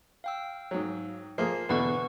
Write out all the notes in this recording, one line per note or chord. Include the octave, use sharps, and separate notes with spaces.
F5 G5 E6
G#2 F#3
F3 A#3 G#4 C6 C7
E2 B2 D3 B4 F#5 C#6